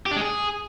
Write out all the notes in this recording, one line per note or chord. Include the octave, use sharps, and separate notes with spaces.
G4
D4
G#3
G#4